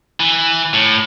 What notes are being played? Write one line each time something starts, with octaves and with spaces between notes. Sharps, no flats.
E3
A2